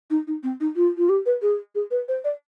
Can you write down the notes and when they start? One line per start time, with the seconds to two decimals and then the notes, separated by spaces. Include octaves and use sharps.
0.10 D#4
0.27 D#4
0.43 C4
0.60 D#4
0.76 F4
0.97 F4
1.09 G4
1.26 B4
1.42 G#4
1.75 G#4
1.91 B4
2.08 C5
2.24 D5